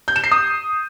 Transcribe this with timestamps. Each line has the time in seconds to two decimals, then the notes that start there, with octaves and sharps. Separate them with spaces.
0.08 G6
0.16 E7
0.24 C7
0.32 D#6